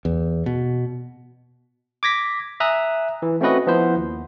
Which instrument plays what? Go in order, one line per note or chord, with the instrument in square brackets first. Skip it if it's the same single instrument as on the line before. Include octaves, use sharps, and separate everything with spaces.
[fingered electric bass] E2
B2
[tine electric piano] D6 G#6 A#6 B6
E5 G#5 A#5 D#6 F#6
E3
A3 C4 C#4 F#4 B4 D#5
F3 B3 E4 C5
D#2